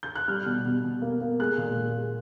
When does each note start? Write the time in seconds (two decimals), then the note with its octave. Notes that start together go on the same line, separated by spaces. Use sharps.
0.03 G6
0.16 F#6
0.28 G3 F6
0.46 B2
0.65 B2
0.84 B2
1.02 A#3
1.21 A#3
1.39 G#3 F#6
1.58 A#2
1.76 A#2
1.96 G#3